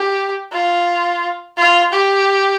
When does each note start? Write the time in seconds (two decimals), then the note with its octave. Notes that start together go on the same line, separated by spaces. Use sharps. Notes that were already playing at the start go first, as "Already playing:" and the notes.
Already playing: G4
0.52 F4
1.57 F4
1.92 G4